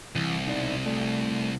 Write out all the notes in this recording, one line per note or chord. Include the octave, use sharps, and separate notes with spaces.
C2 E3
B1 D#4 D5
A3 A4 D5